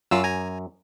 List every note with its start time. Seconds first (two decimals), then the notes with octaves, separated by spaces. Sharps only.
0.11 F#2 F#3 F4 E6
0.24 G#5 A#5